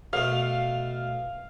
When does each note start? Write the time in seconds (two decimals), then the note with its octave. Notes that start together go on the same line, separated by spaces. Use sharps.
0.13 B2 A3 F5